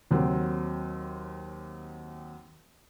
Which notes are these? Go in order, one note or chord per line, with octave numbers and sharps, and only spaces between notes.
D#2 F#3 C4